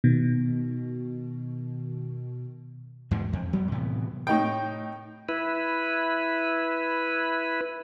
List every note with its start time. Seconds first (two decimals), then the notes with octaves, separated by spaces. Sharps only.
0.04 B2 D#3
3.11 E2 G#2 B2 D3
3.33 F2
3.53 F#3 G#3 B3
3.72 A2 C3 E3 B3
4.27 A2 D#4 G5
5.29 E4 B4